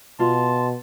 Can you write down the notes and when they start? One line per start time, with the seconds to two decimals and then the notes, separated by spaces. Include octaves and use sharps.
0.20 B2 F4 A5 C6